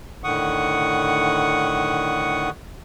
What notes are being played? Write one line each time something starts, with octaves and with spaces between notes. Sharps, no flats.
A2 D3 D#3 F#5 C#6 D#6